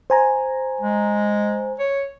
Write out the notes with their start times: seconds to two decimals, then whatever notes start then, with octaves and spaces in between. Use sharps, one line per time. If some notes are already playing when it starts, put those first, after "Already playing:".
0.10 C5 G#5 A#5
0.81 G#3
1.79 C#5